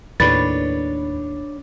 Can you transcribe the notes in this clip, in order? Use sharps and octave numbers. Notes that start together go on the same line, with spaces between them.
D#2 A2 D4 B4 C#5 A6